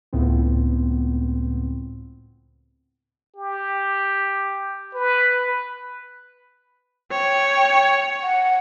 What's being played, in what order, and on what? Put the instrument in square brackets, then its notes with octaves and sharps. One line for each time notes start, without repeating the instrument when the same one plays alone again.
[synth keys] C#2 A2 B3 C4
[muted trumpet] G4
B4
[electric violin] C#5 [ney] G5
[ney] F#5